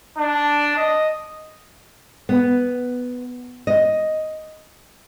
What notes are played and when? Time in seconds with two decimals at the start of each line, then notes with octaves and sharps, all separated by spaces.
0.18 D4
0.76 D#5
2.29 B3
3.67 D#5